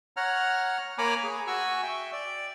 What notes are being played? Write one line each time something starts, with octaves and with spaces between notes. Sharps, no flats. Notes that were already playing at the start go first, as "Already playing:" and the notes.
C#5 F#5 A#5 F6
A#3 C#5 G#5 A#5 B5 D6
G#4
F#4 G#5 C#6 E6
E5 G5
D5